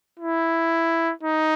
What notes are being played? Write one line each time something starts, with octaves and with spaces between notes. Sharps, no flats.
E4
D#4